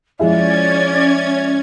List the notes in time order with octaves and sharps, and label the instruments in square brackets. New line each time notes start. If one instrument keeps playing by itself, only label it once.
[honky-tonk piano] F3 G#3 E4 [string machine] C#4 G#6 [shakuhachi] D5